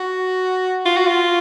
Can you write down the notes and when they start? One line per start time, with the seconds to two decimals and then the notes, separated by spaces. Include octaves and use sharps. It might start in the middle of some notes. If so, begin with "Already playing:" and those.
Already playing: F#4
0.85 F4
0.97 F#4
1.07 F4